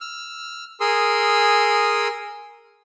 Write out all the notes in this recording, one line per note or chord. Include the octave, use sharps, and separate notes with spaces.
E6 F6
G#4 A#4 C6 D#6 E6